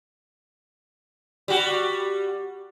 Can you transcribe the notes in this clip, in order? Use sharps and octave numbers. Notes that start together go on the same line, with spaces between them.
G3 F#4